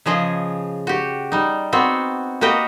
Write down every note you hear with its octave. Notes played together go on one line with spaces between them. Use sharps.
C#3 F3 G#4 D#5
F#4 G4
G3 D#4
B3 C4 F#4
A#3 F#4 G4 B4 D#5 G5